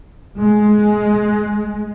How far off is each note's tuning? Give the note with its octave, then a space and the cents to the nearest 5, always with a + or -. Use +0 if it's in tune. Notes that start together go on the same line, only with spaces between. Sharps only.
G#3 +15